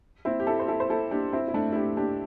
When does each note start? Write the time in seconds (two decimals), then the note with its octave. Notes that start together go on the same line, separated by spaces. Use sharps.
0.25 C4 E4
0.40 G4
0.47 E4 A4
0.59 C5
0.68 E4 A4
0.80 C5
0.90 E4 A4
1.11 D4 G4
1.33 C4 E4
1.48 E4
1.54 A3 D4
1.72 E4
1.76 D4 G4
1.97 D4 G4